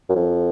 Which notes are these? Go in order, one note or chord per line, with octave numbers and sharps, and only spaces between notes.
F#2
F2